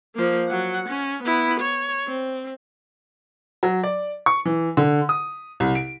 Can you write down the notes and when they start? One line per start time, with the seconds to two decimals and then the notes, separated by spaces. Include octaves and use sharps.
0.15 F3 A#3
0.48 F#3 F#5
0.89 C#4
1.23 B3 E4
1.60 C#5
2.08 C4
3.63 F#3
3.83 D5
4.26 C#6
4.45 E3
4.77 D3
5.09 D#6
5.60 C2
5.75 D7